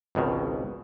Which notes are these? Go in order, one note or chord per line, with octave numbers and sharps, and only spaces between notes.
G#1 C#2 B2 D#3